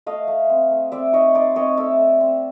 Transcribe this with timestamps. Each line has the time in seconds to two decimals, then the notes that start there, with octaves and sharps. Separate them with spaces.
0.06 A3 D#5 F5
0.28 A3
0.50 C4
0.70 A3
0.92 C4 D5 E5
1.13 D#4 C#5 D#5
1.35 D#4 C5 D5
1.56 C4 C#5 D#5
1.77 A3 D5 E5
1.99 A3
2.20 C4